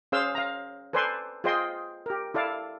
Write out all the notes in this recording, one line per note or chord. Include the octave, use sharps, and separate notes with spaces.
C#4 G#4 C5 F5 C6 E6
F5 A#5
A4 B4 C5 D5 G#5 C6
F4 G#4 C5 D#5 G5 C6
G4 A#4
E4 A4 D5 F5